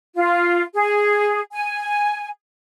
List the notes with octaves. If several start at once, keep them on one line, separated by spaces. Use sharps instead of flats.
F4
G#4
G#5